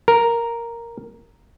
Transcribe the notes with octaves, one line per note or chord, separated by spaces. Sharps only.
A#4